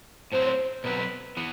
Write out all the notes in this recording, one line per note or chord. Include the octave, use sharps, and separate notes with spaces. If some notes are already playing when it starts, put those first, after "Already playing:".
A2 F#3 C4 C5
B2 F#3 C4 B4
E3 B3